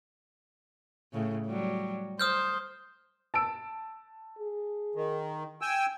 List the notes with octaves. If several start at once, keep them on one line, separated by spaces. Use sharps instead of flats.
A2 C#3
F#3 G3
C5 D#6 F6 G6
A5 E6 D7
G#4
D#3
G5 G#5 E6